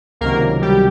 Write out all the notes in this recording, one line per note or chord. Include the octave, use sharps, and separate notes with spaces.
C#2 C3 D#3 F#3 A#3 A#4
G3 G4